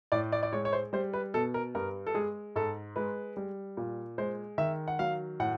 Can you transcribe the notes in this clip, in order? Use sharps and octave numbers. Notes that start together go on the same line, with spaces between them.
A2 D5
D5
D5
G#3 C#5
C#5
C5
G3 C5
B4
B2 A4
A#4
G2 A#4
A4
G#3 G#4
G#2 A4
G#3 B4
G3
A#2
G#3 C5
D#3 E5
F#5
F#3 F5
A2 F#5